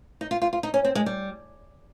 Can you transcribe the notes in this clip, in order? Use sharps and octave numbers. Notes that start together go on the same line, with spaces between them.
D#4
F4
F4
F4
D#4
C#4
C4
G#3
G3